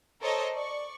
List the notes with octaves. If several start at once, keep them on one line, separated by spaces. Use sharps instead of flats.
A4 A#4 C5 C#5 D#5
D5 C#6